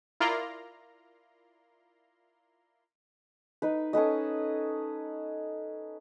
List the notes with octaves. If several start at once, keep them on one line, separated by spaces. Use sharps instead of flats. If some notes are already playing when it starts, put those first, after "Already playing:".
E4 F4 A#4 D5 A#5 C6
D#4 B4
C#4 A4 B4 D#5